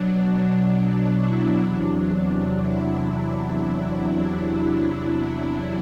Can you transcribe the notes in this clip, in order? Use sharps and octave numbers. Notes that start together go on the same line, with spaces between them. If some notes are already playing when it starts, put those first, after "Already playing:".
Already playing: B2 F#3 D4
E4
E2 C3 F#3 D4
E4